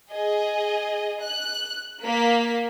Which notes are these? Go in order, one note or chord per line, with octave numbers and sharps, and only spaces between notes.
G#4 D#5
F#6
A#3 B6